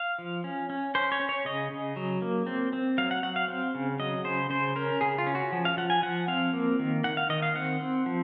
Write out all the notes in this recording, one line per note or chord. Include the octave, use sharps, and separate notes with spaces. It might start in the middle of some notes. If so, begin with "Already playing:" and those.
Already playing: F5
F3
C#4
C#4
C#4 C5
C#5
C#4
C#5
C#3 D#5
C#3
F#3
A#3
C4
C4
F#3 F5
F#5
F#3 F#5
F5
C4
C#3
F#3 D#5
C#3 C5
C#3 C5
C#4 A#4
C#3 G#4
F4
C#4
F#4
F3
F5
F3 F#5
G#5
F3 F#5
C4 F5
A#3
D#3
D#3 F#5
F5
D#3 D#5
F5
C4 F#5
C4
F3